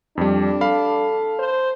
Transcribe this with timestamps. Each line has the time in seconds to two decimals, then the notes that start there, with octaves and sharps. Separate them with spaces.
0.17 F2 G3 D4
0.61 A4 F5 B5
1.39 C5